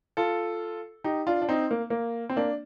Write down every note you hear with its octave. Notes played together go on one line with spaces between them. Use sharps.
F4 A4
D#4 G4
D4 F4
D4
C4 D#4
A#3
A#3
C4
A#3 D4